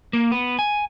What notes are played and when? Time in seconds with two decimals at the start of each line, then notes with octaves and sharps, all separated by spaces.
0.13 A#3
0.32 B3
0.59 G#5